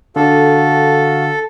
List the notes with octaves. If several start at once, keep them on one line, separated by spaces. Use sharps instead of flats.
D3 F#4 A4 F5